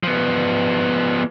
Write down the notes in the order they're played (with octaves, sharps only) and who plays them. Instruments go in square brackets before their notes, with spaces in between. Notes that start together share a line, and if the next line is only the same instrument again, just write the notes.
[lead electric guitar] F3 B3